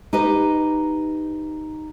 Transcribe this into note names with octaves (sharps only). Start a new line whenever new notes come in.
D#4 G4 B4 D#5